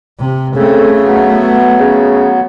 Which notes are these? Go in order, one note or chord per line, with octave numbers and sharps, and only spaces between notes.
C3
C#3 A3 C4 A4
F#3 B3
C#3